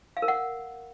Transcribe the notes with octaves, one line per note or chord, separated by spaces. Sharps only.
F5
A#4
F#5